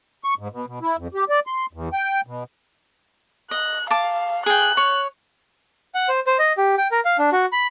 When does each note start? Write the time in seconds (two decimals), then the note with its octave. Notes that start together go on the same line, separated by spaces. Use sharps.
0.24 C#6
0.39 G#2
0.52 B2
0.67 B2
0.82 E4
0.97 F2
1.14 G4
1.29 D5
1.47 C6
1.73 E2
1.93 G5
2.26 B2
3.51 D#5 F#6
3.90 F5 A5 D6
4.46 G#4 G5 F#6
4.77 C#5
5.95 F#5
6.09 C5
6.27 C5
6.39 D#5
6.58 G4
6.78 G5
6.91 A#4
7.05 F5
7.18 D4
7.32 F#4
7.52 B5